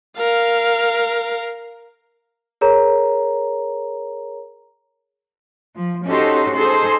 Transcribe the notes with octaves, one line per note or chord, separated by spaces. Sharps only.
A#4 F5
G#4 A#4 C#5 A#5
F3
C#4 D#4 F#4 G4 A4 C5
D#4 G#4 A4 C5